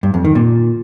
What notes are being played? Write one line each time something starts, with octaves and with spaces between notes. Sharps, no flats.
G2
F2
D#3
A#2